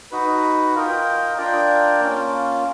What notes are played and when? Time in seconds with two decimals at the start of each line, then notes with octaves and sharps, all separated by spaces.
0.11 D#4 F#4 B4
0.75 F4 A#4 D#5 G5
1.38 D4 F4 A#4 D5 G5
2.01 A#3 C#4 F4